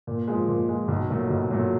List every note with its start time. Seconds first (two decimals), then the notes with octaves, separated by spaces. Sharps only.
0.07 A#2
0.27 F3 G#3
0.48 A#2
0.69 F3 G#3
0.88 B1
1.09 A#2 F#3 A3
1.30 B1
1.50 A#2 F#3 A3